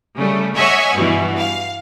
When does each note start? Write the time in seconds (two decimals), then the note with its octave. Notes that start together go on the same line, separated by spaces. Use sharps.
0.16 C#3 G3 A3
0.55 C#5 D#5 E5 F#5 G#5 C#6
0.94 G2 B2 E3
1.38 F5